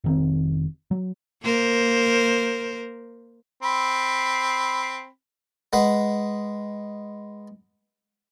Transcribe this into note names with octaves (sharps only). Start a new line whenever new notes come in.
F1 D#3 C4
F#3
A#3 A#4 C5
C4 B5
G#3 B4 F#5